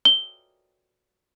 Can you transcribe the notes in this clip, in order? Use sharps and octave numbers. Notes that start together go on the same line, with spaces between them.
G7